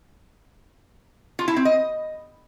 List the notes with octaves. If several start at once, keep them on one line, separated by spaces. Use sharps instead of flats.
F4
E4
C4
D#5